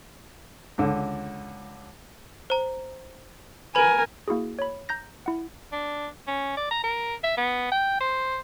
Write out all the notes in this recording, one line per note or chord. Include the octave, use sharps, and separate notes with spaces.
C#2 D3
C5 A#5
A#4 B4 G#5 B5
A#3 E4 F#4 G#4
C#5 B5
A#5 G6 A#6
E4 F#5
D4
C#4
D5
A#5
A#4
E5
B3
G5
C5